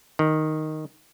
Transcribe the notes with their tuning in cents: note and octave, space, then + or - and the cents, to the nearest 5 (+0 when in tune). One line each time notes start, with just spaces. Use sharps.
D#3 +0